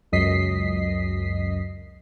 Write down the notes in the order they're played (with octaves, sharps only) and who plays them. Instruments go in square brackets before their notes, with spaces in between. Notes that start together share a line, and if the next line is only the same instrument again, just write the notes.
[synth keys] C#2 F#2 D#5 B6 C7